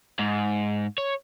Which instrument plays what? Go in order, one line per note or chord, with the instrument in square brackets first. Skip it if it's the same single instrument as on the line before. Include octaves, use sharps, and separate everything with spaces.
[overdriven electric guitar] G#2
C#5